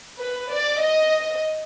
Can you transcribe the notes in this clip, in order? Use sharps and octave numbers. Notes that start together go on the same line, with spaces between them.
B4
D5
D#5